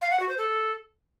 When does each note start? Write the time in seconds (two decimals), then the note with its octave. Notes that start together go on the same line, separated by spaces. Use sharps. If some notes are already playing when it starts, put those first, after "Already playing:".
0.01 F5
0.11 F#5
0.20 F#4
0.29 C5
0.38 A4